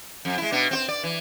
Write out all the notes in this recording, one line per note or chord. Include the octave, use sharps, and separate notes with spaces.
F2
G#3 E4
B2 D4
C4 F#4 C5
D5
E3